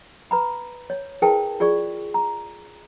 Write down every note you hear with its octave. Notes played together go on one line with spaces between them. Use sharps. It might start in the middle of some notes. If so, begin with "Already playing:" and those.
B4 A#5 B5
C#5
E4 G#4 A#4 B4 G5 A5
F4 G#4 D5 C#6
A#5